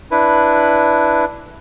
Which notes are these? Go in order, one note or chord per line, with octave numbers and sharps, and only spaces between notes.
D4 E4 B4